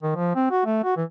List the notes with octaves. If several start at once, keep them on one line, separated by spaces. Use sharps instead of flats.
D#3
F3
C4
F#4
A3
F#4
E3